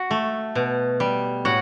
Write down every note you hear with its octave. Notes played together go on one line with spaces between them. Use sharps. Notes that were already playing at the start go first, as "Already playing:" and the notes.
Already playing: F#4 F#5
A3
B2
G3
A2 F#4 F#5